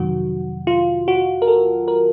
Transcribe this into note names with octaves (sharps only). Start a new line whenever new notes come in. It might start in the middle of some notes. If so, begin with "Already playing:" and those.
Already playing: F2 C3 D#3 F#3 F#4
F4
F#4
A#4
A4
A#4